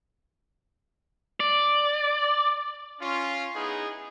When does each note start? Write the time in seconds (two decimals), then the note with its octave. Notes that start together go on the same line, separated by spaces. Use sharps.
1.40 D5
3.00 C#4 F4
3.53 B3 D#4 E4 G#4